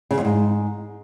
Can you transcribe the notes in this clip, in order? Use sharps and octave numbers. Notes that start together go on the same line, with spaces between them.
C#3
F2
G#2